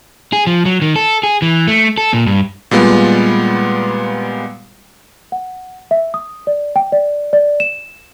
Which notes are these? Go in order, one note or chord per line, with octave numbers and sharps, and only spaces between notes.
G#4
F3
F#3
D#3
A4
G#4
E3
A3
A4
A#2
G2
A#2 G3 G#3 B3 F4
F#5
E5
D#6
D5
G5
D5
D5
E7